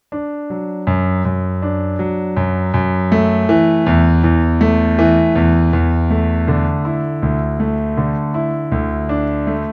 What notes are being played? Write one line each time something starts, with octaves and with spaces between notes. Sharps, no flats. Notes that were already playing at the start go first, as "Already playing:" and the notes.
D4
F#3
F#2
F#2
D4
F#3
F#2
F#2
A3
E3
E2
E2
A3
E3
E2
E2
A3
D3
E4
D2
A3
D3
E4
D2
D4
A3